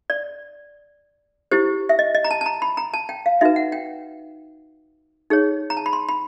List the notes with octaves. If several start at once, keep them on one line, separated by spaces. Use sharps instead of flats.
D5
E4 G4 C5
E5
D#5
D#5
A#5
A5
A5
A#5
B5
A#5
A5
G5
F5
D#4 F#4 B4 E5
F#5
G5
D#4 G#4 C#5
A#5
A5
B5
C6
B5